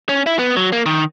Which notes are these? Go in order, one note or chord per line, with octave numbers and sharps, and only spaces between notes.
C#4
E4
B3
F#3
A#3
D#3